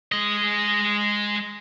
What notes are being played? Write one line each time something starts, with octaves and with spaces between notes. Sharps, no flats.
G#3 D#5